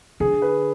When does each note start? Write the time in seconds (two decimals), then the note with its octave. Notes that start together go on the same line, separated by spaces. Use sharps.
0.20 D3 G#4
0.42 B4